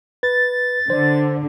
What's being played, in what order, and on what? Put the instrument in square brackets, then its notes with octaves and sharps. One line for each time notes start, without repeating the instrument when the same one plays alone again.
[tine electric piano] B4 [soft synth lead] A6
[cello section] D3 [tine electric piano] C5 D5